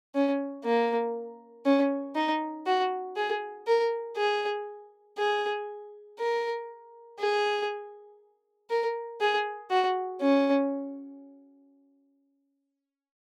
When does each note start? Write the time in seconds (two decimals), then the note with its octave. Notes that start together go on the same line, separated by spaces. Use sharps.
0.15 C#4
0.64 A#3
1.66 C#4
2.15 D#4
2.66 F#4
3.17 G#4
3.67 A#4
4.17 G#4
5.18 G#4
6.19 A#4
7.19 G#4
8.70 A#4
9.21 G#4
9.71 F#4
10.21 C#4